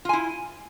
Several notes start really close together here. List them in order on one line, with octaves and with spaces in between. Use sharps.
F4 G#5 E4